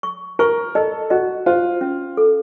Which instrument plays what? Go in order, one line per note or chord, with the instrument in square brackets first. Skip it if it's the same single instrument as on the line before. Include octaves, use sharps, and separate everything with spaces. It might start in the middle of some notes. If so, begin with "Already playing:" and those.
[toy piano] C#6
[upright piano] A#4 [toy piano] C#6
[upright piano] A4 [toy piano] D#5
[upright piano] F#4 [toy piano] D#5
[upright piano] F4 [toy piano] C5
[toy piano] C#4
A4